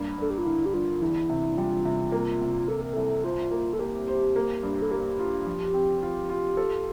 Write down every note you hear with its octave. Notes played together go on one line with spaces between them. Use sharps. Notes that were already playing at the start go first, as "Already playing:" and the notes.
Already playing: G2 A#3
G2 A4
G4
F4
D3 E4
G4
G2 F4
E2 E4
C3
G3 F4
C3
A#3
C3
A#3 A4
A#4
C2 A4
F4 C5
A#3
A4
A#3 G4
C5
A#3
G2
A4
A#3 G4
F4
F3
C4
F4
F4
A4